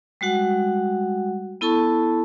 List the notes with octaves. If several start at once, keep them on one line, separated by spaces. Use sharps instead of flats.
G3 G#3 F#4 F#5
B3 E4 A4 A5 C#6